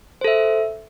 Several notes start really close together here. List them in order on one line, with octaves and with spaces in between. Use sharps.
C5 A4 E5